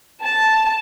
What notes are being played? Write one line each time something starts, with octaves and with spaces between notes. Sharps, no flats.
A5